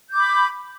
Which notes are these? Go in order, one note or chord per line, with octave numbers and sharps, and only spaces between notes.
B5 D6 G6